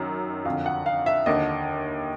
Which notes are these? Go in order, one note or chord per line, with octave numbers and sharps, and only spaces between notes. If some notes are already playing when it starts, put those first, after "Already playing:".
Already playing: F#2 D#3
F2 D3 F5
F#5
F5
E5
D#2 D3 D#5